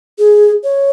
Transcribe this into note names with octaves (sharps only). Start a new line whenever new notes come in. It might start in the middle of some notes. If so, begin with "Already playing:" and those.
G#4
C#5